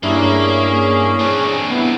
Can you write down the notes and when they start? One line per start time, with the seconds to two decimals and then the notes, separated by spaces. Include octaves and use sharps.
0.03 G2 A#3 C#4 D4 E4 G#4
1.19 C4 D4
1.70 B3 E4